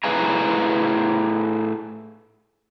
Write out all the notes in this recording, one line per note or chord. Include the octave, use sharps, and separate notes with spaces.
A2 G#4 B4 F5 G#5 A#5